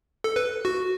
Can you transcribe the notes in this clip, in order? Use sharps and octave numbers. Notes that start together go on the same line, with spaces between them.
A4
B4
F#4